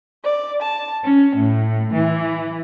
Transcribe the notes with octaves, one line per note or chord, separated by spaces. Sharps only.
D5
A5
C#4
A2
E3